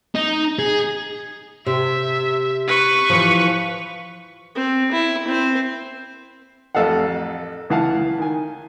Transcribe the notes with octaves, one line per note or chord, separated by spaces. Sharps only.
D#4
G#4
C3 E5
B4 C#6
E3 F3
C4
E4
C4 C5
A1 F2 A4 D#5 F5 F#5
C#2 E3 E4 F5 F#5 A5
D#3 G#5